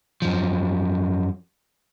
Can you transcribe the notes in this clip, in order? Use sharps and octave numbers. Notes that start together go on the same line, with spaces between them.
F#2 F3